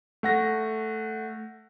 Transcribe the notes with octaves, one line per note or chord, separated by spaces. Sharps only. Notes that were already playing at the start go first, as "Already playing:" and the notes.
A3 F#5 A#6